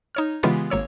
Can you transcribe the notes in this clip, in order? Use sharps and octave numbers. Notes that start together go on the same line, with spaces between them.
D#4 C#5 F6
C#3 E3 G#3 B3 F4 G4
G#1 A#3 C#5 E6